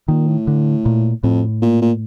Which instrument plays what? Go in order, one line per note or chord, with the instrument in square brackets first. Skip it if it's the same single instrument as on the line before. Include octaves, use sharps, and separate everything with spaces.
[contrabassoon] A#2 [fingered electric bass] D#3
[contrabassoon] A2
[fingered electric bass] D3
A#2
[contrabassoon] F2 [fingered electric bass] A2
[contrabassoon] A#2
A#2